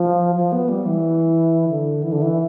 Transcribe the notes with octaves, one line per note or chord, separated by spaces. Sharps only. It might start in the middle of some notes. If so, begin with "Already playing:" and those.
Already playing: F3
F3
B3
G3
E3
D3
E3
D3
E3